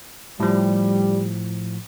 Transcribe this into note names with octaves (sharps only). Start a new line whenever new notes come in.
A2 F3 G3